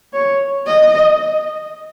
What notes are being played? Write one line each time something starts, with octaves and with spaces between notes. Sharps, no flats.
C#5
D#5